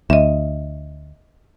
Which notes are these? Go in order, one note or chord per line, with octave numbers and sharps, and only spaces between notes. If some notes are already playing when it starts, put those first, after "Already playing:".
D2 D#5 E5